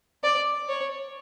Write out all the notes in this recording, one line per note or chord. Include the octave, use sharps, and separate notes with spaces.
D5
C#5